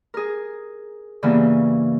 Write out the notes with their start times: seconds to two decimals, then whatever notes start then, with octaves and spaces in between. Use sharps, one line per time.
0.14 G#4 A#4
1.22 G2 C#3 E3 A#3 B3